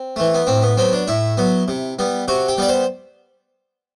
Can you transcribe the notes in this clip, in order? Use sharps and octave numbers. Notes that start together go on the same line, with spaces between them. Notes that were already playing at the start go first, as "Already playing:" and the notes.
Already playing: C4
E3 A3
B3
A2 C4
B3
F#3 B3 C4
D4
A2 E4
F#3 B3
C3
G3 B3
C3 F#4
G4
G3 B3 D5
C5